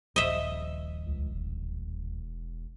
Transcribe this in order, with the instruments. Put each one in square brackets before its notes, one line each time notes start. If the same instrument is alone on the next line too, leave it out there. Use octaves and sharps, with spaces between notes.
[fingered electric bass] D#1 A#1 [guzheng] D#5 E5
[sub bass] C#2
E1